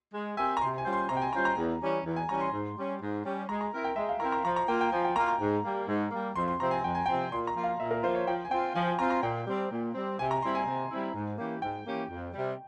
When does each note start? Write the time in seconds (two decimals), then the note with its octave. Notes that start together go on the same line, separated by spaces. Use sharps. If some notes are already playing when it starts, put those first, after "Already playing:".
0.14 G#3
0.37 C4 G4 A#4 E5 G#5
0.57 A#5
0.61 C3 C6
0.78 G#5
0.85 G3 C#4 F4 C5
0.93 C6
1.09 C3 A#5
1.17 G5
1.22 G#5
1.33 G3 C#4 F4 C5 A#5
1.45 A#5
1.57 E2
1.81 E3 G3 C#4
2.05 E2
2.16 G#5
2.29 E3 G3 C#4 A#5
2.40 C6
2.53 G#2
2.76 G3 C#4
3.01 G#2
3.24 G3 C#4
3.49 G#3 A#5
3.61 A#5
3.73 C4 E4 A#4
3.84 G5
3.96 G#3 E5
4.09 F5
4.20 C4 E4 A#4 A#5
4.32 A#5
4.45 F3 A#5
4.56 A#5
4.68 A#3 F4 G5
4.81 G5
4.92 F3 G#5
5.05 G5
5.16 A#3 A#5
5.19 F4
5.28 A#5
5.40 G#2
5.64 G3 A#3
5.88 G#2
6.11 G3 A#3
6.36 F2 C6
6.48 C6
6.60 C3 F3 C4 A#5
6.71 G#5
6.84 F2 G5
6.95 G#5
7.06 C3 F3 C4 G5
7.32 A#2 C6
7.47 A#5
7.56 F3 A#3 F4
7.64 F5
7.80 A#2 E5
7.91 A#4
8.03 F3 A#3 F4 C5
8.15 C#5
8.27 F3 G5
8.45 G#5
8.51 C4 F4 G5
8.75 F3 G#5
8.87 G#5
8.99 C4 F4 A#5
9.10 A#5
9.23 A#2 G5
9.47 G3 C4
9.71 A#2
9.95 G3 C4
10.19 C3 G#5
10.31 A#5
10.42 G3 C4 E4 C6
10.55 G#5
10.66 C3
10.91 G3 C4 E4
11.15 G#2
11.38 E3 A#3 C#4 G4
11.62 G#2 G5
11.86 E3 A#3 C#4 G4
12.10 F2
12.34 C3 G3